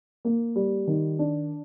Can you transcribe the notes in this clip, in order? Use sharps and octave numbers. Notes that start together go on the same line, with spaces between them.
A#3
G3
D#3
D4